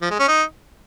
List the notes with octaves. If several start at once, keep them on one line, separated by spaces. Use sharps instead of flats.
F3
G#3
C#4
D#4